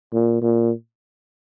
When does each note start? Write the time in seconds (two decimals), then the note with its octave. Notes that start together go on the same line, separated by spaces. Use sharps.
0.13 A#2
0.41 A#2